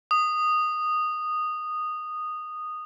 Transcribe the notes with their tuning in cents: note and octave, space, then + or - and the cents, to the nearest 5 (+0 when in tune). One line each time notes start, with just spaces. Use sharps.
D#6 -10